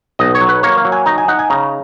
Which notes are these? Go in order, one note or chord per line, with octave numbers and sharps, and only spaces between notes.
B1 D#5
C#5
F#3
B4
A#3 C#5
F5
F#3
G#5
D#4 A#5
G#5
D#4 F#5
G#5
C#3 A#5